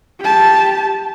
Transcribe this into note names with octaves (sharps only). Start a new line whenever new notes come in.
G4 A5